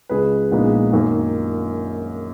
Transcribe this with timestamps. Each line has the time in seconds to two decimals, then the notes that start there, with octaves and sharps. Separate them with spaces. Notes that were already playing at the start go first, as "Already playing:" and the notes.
0.09 C#2 C#3 G#3 G#4 B4
0.51 A#1 A#2 G#3 B3 D#4
0.93 F#2 D#3 A#3 D#4